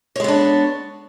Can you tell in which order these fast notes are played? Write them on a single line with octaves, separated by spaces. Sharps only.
C#5 G#3 B3 D4